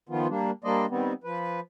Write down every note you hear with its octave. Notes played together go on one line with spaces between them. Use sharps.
D#3 F3 B3 F4
G3 A#3 D4
G3 A#3 D4 C5 D5 D#5
D#3 G3 B3 C4
F3 B4